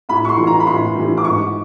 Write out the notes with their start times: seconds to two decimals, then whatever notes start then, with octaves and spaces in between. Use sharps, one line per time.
0.09 A2 B5
0.25 C#6
0.29 C6
0.38 E3 G3
0.47 A#5
0.60 B5
0.67 A2 C6
0.95 E3 G3
1.17 D6
1.24 G#2 C#6